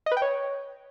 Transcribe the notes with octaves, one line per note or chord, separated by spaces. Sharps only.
D#5
B4
G5
C#5